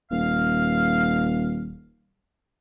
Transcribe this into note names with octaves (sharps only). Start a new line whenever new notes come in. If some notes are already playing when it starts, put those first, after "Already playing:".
D#1 F5